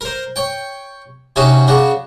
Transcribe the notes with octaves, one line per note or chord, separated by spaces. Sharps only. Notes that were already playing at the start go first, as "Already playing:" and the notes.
A#4 C5
C#5 G5
C3 C4 C#4 D#4 F#4
C#3 D4 F#4